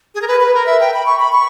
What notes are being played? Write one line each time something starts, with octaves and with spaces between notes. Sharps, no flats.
G#4
A#4
B4
B4
A#4
E5
G5
B5
C#6
B5
C#6